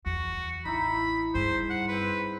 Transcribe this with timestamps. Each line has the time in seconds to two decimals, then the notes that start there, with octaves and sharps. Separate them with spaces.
0.06 E2 F#4
0.65 A1 D#4 E4 B5
1.35 G2 G#4 C5
1.70 F#5
1.88 C4 B4 C5